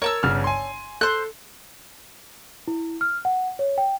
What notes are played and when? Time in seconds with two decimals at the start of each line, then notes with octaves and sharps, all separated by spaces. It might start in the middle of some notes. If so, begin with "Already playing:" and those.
0.02 A#4 C#5 A5 E6
0.23 G1 C#3 F6
0.44 G#5 C6
1.01 A4 C5 F#6
2.68 E4
3.01 F6
3.25 F#5
3.59 C#5
3.78 G5